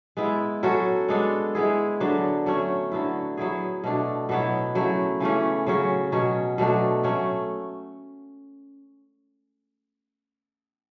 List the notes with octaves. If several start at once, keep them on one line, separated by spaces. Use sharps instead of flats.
G#3 B3 E4
F#3 C#4 F#4 A4
G#3 B3 D4 A4
G#3 B3 E4 G#4
D3 F#3 B3 D4
F#3 A3 C#4
D3 F#3 B3 E4
F#3 B3 E4 G#4
B2 A3 D4
B2 F#3 B3 E4
C#3 F#3 A3 E4
C#3 E3 A3 C#4
C#3 F#3 C#4
B2 F#3 C#4
B2 F#3 A3 D4
F#3 A3 C#4